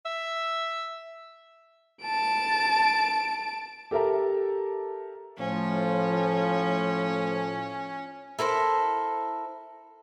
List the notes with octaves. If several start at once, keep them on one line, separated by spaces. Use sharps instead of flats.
E5
A5 D7
G4 A4 A#4 E5 A5 A#5
A2 F3 C#4
E4 A4 A#4 C5